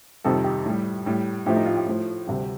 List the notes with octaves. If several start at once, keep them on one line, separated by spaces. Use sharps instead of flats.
F2 C3 D#3 G3 A4
G4
A2 G3
A2 G3
A2 F3 A3 G4
D#4
F4
G4
A2 F3 A3
D2 C3 G3